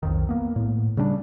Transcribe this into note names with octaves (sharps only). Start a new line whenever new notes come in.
B1 F2 D#3
A#3 B3
A2
C#3 G3 B3 D4